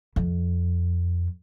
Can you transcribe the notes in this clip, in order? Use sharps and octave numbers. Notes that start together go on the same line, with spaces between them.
F2